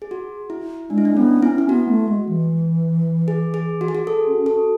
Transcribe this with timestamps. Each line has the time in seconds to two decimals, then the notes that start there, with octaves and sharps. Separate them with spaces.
0.02 G#4
0.11 F#4
0.50 E4
0.90 G#3 D4
0.98 E4
1.05 D4
1.16 B3 C#4
1.43 C#4 E4
1.58 E4
1.69 B3 F#4
1.89 A3
2.09 G#3
2.29 E3
3.28 G#4
3.54 G#4
3.81 F#4
3.88 G#4
3.95 F#4
4.07 A4
4.27 C#4
4.46 F#4 A4